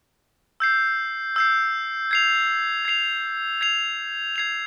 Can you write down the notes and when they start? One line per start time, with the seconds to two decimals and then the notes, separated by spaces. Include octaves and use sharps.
0.60 E6 G6 C7
1.36 E6 G6 C7
2.11 G#6 C7 F7
2.85 G#6 C7 F7
3.61 G#6 C7 F7
4.36 G#6 C7 F7